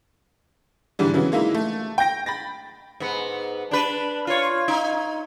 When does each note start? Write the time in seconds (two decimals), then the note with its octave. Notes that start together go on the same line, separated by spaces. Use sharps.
0.99 G#2 D3 E3 G3
1.14 C#3 E3 F#3 B3
1.32 G#3 A#3 D#4 E4
1.54 A3
1.98 G5 G6 A#6 D7
2.26 B5 A6 A#6
3.00 G#2 B3
3.71 D4 B4
4.27 F4 C#5
4.68 D#4